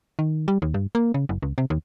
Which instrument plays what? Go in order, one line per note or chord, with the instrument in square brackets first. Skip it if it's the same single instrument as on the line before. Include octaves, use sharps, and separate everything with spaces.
[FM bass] D#3
G3
D#2
G2
A#3
C#3
F#1
C#2
C3
D#2